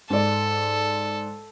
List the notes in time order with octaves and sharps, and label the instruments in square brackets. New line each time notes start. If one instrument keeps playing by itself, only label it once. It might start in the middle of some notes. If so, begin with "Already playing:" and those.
[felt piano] G#2 D5 [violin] A4